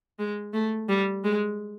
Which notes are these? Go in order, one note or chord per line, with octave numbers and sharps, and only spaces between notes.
G#3
A3
G3
G#3